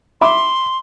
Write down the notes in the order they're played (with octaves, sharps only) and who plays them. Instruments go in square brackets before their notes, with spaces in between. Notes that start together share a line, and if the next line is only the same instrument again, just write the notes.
[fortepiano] E5 B5 D6 [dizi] C6